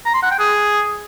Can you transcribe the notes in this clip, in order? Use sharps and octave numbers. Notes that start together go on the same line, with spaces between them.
A#5
C6
F#5
G5
G#4